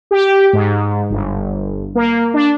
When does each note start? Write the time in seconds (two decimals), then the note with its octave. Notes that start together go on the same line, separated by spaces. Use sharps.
0.11 G4
0.53 G#2
1.10 G1
1.95 A#3
2.34 D4